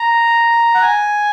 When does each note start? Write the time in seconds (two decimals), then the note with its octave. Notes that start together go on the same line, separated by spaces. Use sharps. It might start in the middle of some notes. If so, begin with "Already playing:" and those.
Already playing: A#5
0.74 F#5
0.82 G#5